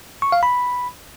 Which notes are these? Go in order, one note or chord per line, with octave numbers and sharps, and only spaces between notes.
C#6
F5
B5